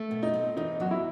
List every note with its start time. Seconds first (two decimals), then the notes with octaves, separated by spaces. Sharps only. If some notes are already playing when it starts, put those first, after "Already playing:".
Already playing: A3
0.11 B2
0.23 D#4
0.34 C4
0.57 E2 D#4
0.80 F#3 F#4
0.91 E4